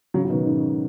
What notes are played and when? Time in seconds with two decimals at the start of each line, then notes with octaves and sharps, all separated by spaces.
0.14 C#3 F#3
0.25 F#3
0.30 B2 D#3
0.46 G#2 C#3